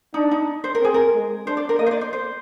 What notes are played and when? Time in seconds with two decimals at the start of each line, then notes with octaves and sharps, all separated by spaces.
0.14 D4 D#4
0.31 D#4
0.64 C5
0.75 A#4
0.80 C4 G#4
0.94 A#4
1.14 G#3
1.47 D4 C5
1.57 D5
1.69 A#4
1.79 A#3 D#5
1.86 C5
1.91 D5
2.01 C5
2.13 C5